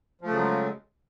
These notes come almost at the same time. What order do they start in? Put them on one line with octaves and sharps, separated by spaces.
F3 A3 C#3 F#3 G#3